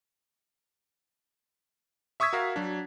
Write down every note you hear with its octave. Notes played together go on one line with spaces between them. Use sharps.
E5 C#6 D#6 E6 G#6 B6
F#4 A#4 F5
F#3 D4